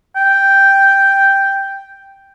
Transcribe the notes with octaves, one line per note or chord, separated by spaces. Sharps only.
G5